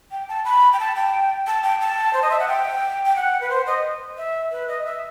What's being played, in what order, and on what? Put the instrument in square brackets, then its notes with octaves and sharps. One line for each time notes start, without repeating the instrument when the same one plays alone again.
[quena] G5
A5
B5
G5
A5
G5
A5
G5
A5
C5
D#5
E5
F#5
G5
G5
F#5
B4
C5
D#5
E5
B4
D#5
E5